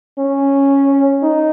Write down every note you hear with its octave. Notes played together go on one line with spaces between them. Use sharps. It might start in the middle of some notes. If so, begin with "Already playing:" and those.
C#4
D#4